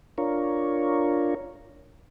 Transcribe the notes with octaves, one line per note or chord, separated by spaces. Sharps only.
D4 F4 A#4 C#5